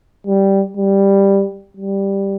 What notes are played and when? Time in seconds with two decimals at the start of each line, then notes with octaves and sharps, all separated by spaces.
0.27 G3
0.77 G3
1.77 G3